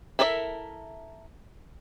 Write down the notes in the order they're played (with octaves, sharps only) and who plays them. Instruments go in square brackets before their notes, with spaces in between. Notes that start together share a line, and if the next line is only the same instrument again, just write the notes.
[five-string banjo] E4 A4 A#4 D5 E5